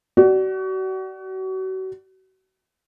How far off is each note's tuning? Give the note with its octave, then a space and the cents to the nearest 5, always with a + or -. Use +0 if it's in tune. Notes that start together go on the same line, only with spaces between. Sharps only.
F#4 +35 D5 +0